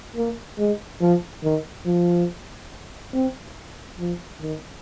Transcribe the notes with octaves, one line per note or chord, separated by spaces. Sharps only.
A#3
G#3
F3
D#3
F3
C4
F3
D#3